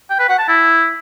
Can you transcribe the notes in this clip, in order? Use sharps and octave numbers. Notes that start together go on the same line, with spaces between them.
G5
B4
F#5
A5
E4